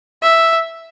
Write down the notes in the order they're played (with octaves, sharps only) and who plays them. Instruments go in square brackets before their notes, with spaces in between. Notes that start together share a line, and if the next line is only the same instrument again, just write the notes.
[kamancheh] E5